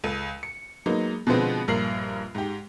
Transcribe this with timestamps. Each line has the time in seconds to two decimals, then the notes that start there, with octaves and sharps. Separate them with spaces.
0.04 C#2 A4 D#7
0.43 C#7
0.86 F#3 G#3 A#3 B3 D#4
1.27 B2 D3 F3 G#3 B3 C4
1.68 A#1 G2 A#4 C7 F#7
2.35 G#2 G4